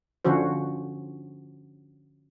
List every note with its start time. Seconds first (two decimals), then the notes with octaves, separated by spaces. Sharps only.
0.25 D3 F3 C#4 F#4 C5